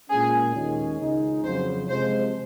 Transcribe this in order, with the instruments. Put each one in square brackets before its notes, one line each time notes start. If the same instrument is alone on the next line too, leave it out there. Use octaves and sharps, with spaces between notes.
[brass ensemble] A#2 G#3 C#4 [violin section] G#4
[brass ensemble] D#2 D#3 G#3 C#4
C#2 C#3 G#3 D#4
[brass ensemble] F2 C#3 F#3 [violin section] C5
[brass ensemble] C3 F3 G#3 [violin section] C5